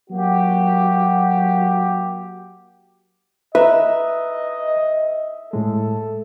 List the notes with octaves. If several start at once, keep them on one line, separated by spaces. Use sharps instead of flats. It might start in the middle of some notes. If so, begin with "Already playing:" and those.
F#3 A#3 F#4 G4
B4 D#5 E5 A#5 F#6
A2 G#3 A4